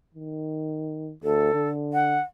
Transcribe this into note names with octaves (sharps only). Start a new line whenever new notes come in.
D#3
D2 A4
D3
F#5